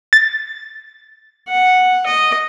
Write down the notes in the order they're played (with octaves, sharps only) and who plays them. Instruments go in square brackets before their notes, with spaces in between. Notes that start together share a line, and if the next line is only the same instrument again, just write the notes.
[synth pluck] A6
[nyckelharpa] F#5
D#5